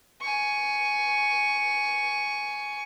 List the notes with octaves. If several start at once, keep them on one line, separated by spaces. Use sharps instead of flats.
G#5 C#6